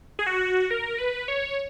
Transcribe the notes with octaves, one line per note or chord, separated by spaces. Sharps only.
G#4
F#4
A#4
B4
C#5